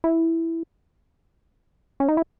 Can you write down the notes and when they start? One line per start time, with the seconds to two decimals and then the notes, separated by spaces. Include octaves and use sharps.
0.04 E4
2.00 C#4
2.09 D#4
2.17 E4